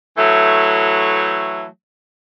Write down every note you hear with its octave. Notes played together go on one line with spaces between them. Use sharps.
E3 F#3 A3